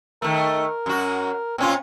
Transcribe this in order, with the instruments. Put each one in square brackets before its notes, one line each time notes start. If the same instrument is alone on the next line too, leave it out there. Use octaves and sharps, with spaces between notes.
[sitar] D#3 A3 [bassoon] A#4
[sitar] F#2 F#4
[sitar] A#2 C#4 F4 [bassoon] C4